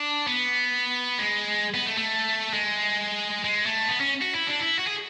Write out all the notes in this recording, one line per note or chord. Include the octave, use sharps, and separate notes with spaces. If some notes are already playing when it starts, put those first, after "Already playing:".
Already playing: D4
B3
G#3
B3
A3
A3
G#3
G#3
A3
B3
C#4
F#4
E4
D4
E4
F#4
G#4